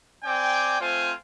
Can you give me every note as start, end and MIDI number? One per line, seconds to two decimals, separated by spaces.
0.24 0.77 60
0.24 0.77 74
0.24 0.77 79
0.24 0.77 80
0.24 0.77 86
0.80 1.13 57
0.80 1.13 60
0.80 1.13 65
0.80 1.13 72
0.80 1.13 80